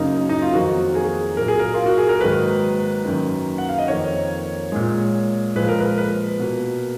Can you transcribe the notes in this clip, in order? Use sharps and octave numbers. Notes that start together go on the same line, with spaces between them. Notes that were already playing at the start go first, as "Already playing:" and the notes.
Already playing: F#2 C#3 F#3 A#3 D#4
D#4
F4
F2 D#3 F#3 A#3 F#4
G#4
A#2 F#3 A#3 A#4
G#4
A#4
F4
F#4
G#4
A#4
G#2 D#3 F#3 A#3 B4
F#2 D#3 A#3
F#5
F5
D#5
F2 D#3 A#3 C#5
A#2 G#3
A#2 F3 G#3 B4
A#4
B4
B4
B2 A#3